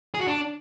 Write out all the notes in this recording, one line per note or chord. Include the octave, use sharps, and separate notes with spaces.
G#4
F#4
D4